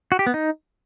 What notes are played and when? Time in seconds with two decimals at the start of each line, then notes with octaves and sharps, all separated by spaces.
0.12 F#4
0.19 G4
0.27 B3
0.34 D#4